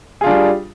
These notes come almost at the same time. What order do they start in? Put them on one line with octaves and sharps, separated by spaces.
G#4 F4 D4 G3